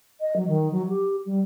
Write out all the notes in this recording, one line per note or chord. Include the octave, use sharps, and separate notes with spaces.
D#5
F#3
D#3
F#3
G4
G3